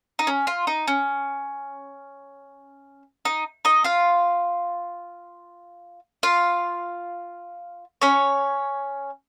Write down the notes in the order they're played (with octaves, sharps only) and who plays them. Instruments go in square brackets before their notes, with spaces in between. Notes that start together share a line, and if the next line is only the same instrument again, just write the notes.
[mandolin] D#4
C#4
F4
D#4
C#4
D#4
D#4 D#5
F4 F5
F4 F5
C#4 C#5